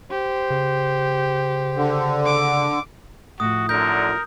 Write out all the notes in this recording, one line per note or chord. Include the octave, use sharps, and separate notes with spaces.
G4 C5
C#3
D3
D6
A2 F3 F#4 D#6
F#2 D3 A#4 G6